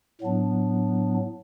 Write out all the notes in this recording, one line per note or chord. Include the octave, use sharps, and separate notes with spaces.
A2 F#3 B3 D4